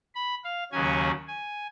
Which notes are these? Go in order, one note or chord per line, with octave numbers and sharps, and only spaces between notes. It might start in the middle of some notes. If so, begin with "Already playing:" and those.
B5
F5
D#2 C#3 F#3 C#4 G#5
G#5